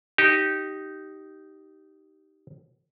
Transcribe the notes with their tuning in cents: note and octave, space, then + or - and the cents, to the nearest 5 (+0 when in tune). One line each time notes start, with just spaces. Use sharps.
D#4 +0 G4 -15